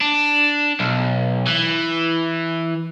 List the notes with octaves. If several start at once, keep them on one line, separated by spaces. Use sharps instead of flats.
D4
B1
E3